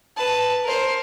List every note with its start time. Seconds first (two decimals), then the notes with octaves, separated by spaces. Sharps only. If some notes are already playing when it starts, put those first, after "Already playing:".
0.17 B4 A5
0.64 A#4 C5